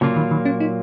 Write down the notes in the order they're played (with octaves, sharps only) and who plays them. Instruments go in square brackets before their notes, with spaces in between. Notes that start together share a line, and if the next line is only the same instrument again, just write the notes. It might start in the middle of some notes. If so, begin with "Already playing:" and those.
[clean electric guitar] A#2 F#3 A#3 F4 [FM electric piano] C#3
[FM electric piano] D#3
D#3
C#4
D#4